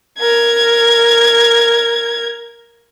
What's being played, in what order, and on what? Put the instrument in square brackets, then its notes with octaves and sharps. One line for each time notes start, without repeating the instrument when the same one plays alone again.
[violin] A#4 G#6